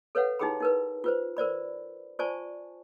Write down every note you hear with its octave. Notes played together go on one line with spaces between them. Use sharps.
A4 B4 C#5 F5 F#5
D#4 E4 G4 G#4 G5 B5
D#4 A#4 B4
F4 B4 C5
A#4 C5 D5 B5
F4 C5 D5 G#5 A5 C#6